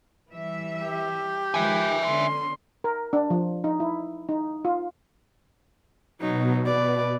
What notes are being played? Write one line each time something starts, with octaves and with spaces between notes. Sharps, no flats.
E3 G3 E5
G4
D#3 F3 G#3 E5 G#5
D3 B3 C#4 C6
A#4
D4
F3
D#4
E4
D#4
F4
B2 F#3 D#4
B4 D5